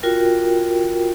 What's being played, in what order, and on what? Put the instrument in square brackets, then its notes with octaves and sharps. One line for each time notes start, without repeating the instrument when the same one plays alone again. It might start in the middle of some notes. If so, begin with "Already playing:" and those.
[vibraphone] F4 F#4 A#4 G5